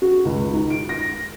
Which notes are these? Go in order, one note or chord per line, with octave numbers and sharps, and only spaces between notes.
F#4
C#2
D#4
D7
A#6